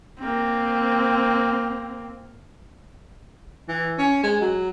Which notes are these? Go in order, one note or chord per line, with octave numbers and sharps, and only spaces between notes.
A#3 C4
E3
C#4
G#3
F#3